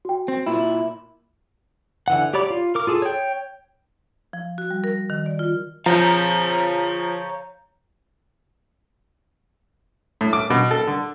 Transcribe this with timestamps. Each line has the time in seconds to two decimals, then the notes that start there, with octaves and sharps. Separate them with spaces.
0.05 F#4 G5
0.28 C4
0.47 A#2 E4
2.08 D3 E3 F#5
2.34 G4 C#5 D5 B5 D6
2.50 F4
2.75 A#4 D6
2.87 F4 G#4 A4
3.02 C#5 G5
4.33 F3
4.58 F#4
4.71 G3
4.84 A#4
5.10 D#3
5.26 D5
5.39 F4
5.86 F3 C#5 F5 A#5 G6
10.21 A2
10.33 D6
10.50 B2
10.71 A4
10.87 D3